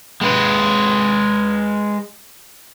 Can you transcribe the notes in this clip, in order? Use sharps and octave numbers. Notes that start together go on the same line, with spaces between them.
G#3 B4